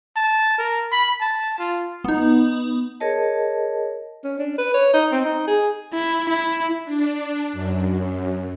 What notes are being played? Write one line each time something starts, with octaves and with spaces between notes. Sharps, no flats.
A5
A#4
B5
A5
F4
B3 D#4
G#4 A#4 C#5 D#5 A5
C#4
D4
B4
C#5
D#4
C4
D#4
G#4
E4
E4
D4
F#2